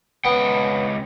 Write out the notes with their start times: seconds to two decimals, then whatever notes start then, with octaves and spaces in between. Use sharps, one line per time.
0.25 C#2 B3 G5